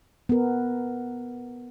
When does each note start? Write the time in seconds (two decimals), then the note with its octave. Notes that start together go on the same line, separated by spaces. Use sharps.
0.29 B3 A#4